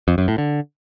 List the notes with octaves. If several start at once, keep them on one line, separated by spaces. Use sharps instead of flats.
F2
F#2
A2
D3